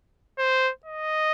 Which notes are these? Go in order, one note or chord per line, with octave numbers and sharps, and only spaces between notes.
C5
D#5